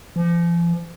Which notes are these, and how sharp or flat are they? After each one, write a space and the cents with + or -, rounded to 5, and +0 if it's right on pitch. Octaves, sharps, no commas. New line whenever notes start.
F3 -40